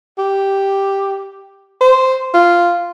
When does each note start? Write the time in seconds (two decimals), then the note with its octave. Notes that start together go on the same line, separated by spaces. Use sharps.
0.18 G4
1.81 C5
2.34 F4